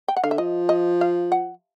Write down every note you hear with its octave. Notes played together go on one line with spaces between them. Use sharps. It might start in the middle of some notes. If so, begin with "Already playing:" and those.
G5
F#5
D3 F5
E5
F3 D#5
D#5
F5
F#5